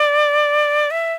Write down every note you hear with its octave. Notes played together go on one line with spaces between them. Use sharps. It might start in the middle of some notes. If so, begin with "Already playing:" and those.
Already playing: D5
E5